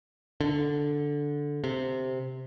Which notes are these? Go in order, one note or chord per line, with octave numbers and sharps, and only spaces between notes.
D3
C3